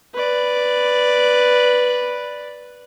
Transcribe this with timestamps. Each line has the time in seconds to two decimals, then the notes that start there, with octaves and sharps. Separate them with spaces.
0.15 B4 D5